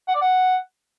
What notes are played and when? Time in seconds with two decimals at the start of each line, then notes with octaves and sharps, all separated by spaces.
0.08 F#5
0.15 D5
0.21 F#5